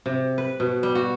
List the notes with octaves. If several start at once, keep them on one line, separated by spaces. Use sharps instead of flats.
C3
B4
B2
G3
F#4